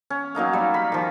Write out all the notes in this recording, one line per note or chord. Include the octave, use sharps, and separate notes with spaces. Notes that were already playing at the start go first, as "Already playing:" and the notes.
C#4
F#3 A#3 D#4 F5
G3
B5
D#3 F3